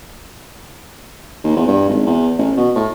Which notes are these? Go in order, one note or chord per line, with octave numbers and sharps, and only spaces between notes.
D#2
E2
G2
G#1
E2
A1
B2
A2